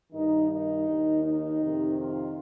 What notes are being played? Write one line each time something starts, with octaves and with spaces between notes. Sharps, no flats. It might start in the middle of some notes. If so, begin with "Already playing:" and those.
G2 D#3 D#4
D#4
D#2 D#3
D#4
F2 C3 D#3
F4